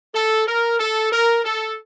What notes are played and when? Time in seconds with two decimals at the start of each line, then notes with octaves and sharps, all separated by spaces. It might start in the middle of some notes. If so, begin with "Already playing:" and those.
0.15 A4
0.47 A#4
0.79 A4
1.12 A#4
1.45 A4